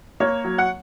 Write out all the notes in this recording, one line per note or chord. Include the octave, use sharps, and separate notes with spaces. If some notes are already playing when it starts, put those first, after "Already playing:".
A#3 C#5
F#3
F#5